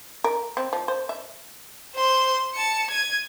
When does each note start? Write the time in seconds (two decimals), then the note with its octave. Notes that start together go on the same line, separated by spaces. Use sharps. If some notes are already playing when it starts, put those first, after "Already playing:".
0.24 A#4
0.57 C4
0.73 F3
0.88 C5
1.09 E5
1.94 C5 C6
2.54 A5 C#7
2.90 G#6 D#7